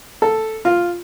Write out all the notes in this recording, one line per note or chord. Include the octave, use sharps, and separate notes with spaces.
A4
F4